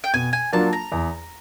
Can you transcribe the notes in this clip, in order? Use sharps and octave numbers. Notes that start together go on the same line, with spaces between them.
G5
B2 G#5
G#5
F#3 A#3 D4 F4 A5
A#5
E2